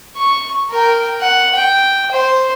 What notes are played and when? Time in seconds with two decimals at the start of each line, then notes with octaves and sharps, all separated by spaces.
0.17 C#6
0.71 A#4 G5
1.21 F#5
1.55 G5
2.11 C5